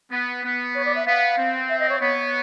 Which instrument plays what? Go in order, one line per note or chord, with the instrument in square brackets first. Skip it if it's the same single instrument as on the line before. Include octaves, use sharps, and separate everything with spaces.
[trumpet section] B3
B3
[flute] C#5
D5
E5
[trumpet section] B3 [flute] F5
[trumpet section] C4
[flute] E5
D#5
C#5
[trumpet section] B3 [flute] C#5